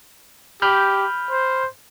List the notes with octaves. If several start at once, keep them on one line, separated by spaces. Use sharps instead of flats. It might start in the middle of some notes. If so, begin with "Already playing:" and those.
G4 B5 F6 G6
C5